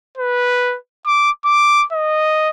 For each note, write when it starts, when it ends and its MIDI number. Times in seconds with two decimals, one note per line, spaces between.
0.18 0.77 71
1.06 1.31 86
1.45 1.85 86
1.93 2.50 75